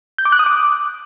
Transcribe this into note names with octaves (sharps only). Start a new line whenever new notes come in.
G6
D6
F#6
D#6
D6